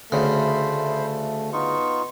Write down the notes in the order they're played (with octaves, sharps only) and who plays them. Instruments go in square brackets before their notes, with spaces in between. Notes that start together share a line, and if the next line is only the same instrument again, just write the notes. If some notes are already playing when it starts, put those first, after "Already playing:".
[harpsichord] D2 C#3 [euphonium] A3 [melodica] C5 B5
[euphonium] B3 [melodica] D#4 F4 C#6